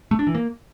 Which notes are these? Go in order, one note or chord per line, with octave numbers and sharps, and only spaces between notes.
A3
D4
E3
A#3